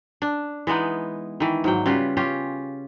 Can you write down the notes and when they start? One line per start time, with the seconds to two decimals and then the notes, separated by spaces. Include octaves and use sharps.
0.22 D4
0.67 E3 G#3 B3 D#4
1.40 D#3 E3
1.64 G#2 F#3 G5
1.86 C#3 G3 F4 B4
2.17 C#4 F4 G4